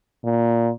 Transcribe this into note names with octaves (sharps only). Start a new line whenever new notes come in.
A#2